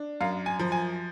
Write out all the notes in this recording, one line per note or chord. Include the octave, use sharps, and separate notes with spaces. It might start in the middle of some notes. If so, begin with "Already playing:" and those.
Already playing: D4
F#2 F5
G#5
F3
G#5